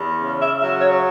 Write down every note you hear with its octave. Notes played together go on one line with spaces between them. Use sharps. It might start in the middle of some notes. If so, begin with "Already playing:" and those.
Already playing: E2
C#3
E5
F#3 E5
C#5